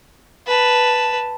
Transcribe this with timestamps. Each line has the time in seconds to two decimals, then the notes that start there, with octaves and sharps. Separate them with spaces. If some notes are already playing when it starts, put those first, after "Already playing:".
0.47 B4 A5